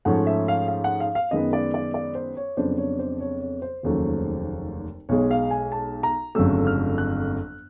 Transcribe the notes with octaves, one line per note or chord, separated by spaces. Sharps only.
G#2 F3 A3 C#4 F#5
E5
F5
F5
F#5
F5
F5
F#2 D#3 G#3 B3 D#5
D5
D5
D5
C5
C#5
F2 C#3 F#3 B3 D4 C5
C#5
C5
C#5
C#5
C5
F1 D#2 C#3 F#3 A3
B1 B2 G#3 C#5
F5
G#5
A5
A#5
G1 F2 C#3 F#3 A3 E6
F6
F#6